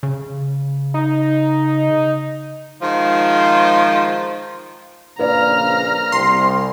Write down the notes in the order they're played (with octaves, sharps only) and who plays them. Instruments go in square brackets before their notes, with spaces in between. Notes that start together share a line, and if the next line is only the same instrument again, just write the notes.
[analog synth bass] C#3
[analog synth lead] D#4
[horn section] D#3 F3 G#3 C5
[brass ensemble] A#1 C#3 F5 [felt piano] B4 D5 [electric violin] A#5 F6
[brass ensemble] C2 [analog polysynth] C6